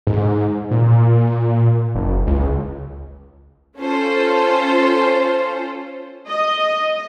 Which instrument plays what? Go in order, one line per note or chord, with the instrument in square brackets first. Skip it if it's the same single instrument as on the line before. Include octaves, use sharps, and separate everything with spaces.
[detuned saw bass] G#2
A#2
F#1
C#2
[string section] C#4 F4 A4 C5
[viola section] D#5